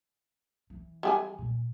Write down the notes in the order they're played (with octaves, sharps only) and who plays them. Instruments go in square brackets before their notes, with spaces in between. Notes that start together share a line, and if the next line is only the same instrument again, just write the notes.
[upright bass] E3
[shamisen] G3 G#4 G#5
[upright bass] A#2